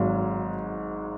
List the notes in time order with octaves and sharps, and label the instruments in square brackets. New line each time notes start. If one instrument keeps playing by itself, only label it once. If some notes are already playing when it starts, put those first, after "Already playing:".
Already playing: [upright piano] G#1 G#2 F#3